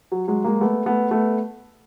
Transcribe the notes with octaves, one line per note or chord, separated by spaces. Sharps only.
F#3
F#3 G#3
G#3 A#3
A3 B3
A3 B3
A3 B3